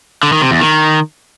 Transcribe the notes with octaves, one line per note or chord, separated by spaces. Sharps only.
D3
D#3
C3
E2
D#3